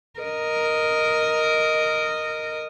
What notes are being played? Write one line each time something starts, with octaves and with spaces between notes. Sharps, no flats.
A#4 D#5